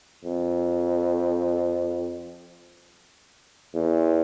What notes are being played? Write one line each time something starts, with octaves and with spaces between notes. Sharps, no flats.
F2
E2